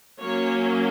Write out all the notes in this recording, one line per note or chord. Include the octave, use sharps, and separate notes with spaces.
F#3 A#3 C#4 C#5